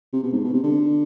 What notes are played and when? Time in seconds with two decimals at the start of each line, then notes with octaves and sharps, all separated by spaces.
0.13 C3
0.23 B2
0.33 G#2
0.44 B2
0.53 C3
0.63 D3